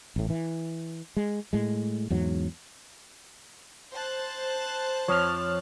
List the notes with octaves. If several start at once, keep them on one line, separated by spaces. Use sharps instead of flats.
A1 A2
E3
G#3
A2 G#3
E2 G#2 F#3
C5 A5 F#6
F2 F3 C#5 F6